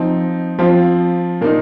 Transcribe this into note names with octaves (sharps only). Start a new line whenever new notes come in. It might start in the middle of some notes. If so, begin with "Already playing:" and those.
Already playing: F3 C4 D#4
F3 C4 F4
A#2 A#3 D#4